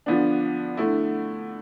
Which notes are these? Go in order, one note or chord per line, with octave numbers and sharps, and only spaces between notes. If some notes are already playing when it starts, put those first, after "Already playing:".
D3 F3 B3 D4
D3 A3 E4